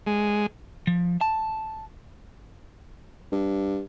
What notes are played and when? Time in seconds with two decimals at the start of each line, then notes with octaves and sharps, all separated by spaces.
0.07 G#3
0.87 F3
1.21 A5
3.32 G2